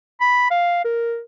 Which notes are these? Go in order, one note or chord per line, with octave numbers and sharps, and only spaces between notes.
B5
F5
A#4